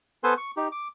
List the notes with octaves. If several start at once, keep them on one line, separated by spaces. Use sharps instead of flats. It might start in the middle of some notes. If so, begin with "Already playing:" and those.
B3 A4 B4 C5 G#5 C6
C#6
D#4 G4
D6